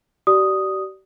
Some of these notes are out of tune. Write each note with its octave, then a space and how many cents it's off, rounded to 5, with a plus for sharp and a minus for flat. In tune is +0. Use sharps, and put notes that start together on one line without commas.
G4 -40 D5 +0 D#6 +0